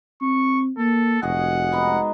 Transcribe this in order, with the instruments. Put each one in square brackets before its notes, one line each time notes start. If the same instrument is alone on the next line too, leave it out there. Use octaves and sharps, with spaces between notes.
[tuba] C4 [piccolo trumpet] C#6
[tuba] A#3 [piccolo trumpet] A4
[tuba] F1 [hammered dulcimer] F#4 G#4 D#5 [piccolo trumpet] F#5
[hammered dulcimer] G#3 B3 D#4